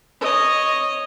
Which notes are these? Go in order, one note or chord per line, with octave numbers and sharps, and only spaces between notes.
C#5 D#5